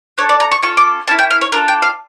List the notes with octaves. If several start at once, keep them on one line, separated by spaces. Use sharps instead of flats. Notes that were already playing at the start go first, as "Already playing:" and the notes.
D4 A4 C#5
D5
A#5
C#6
C#4 F4 A4 C#6
D6
A#3 C#4 E4 A5
G5
F5
C#5
D4 F4 A4 A#4
G5
F5